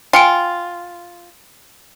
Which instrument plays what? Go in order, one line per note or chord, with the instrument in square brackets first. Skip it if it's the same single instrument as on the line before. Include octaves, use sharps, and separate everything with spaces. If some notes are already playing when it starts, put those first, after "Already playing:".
[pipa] F4 [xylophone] G5 G#5 D7